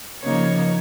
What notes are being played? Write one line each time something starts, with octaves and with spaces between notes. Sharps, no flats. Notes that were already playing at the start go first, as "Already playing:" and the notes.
C#3 F3 A#3 D#4 C#5